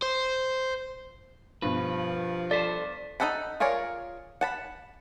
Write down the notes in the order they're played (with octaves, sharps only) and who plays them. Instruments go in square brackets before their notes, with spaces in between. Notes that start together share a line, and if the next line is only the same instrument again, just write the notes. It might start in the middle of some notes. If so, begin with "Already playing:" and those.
[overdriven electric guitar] C5
[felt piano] G2 B2 [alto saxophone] F3 [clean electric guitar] B4
[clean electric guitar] A4 C5 A5 [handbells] D5 B6
[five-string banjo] D#4 E4 A4 F#5 B5
F4 G#4 A#4 C#5 D5
F#5 A5 B5